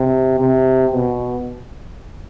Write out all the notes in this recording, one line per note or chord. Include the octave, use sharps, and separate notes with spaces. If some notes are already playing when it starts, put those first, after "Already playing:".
Already playing: C3
C3
B2